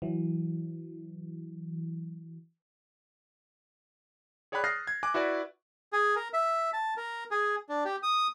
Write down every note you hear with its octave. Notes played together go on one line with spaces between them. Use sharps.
E3 F#3
G#4 C#5 D5 G5 B5 F#6
D#6 F6 G6 A6 A#6 C7
G#6
G#5 D6 F#6
E4 F#4 B4 D5
G#4
A#4
E5
A5
A#4
G#4
D4
G4
D#6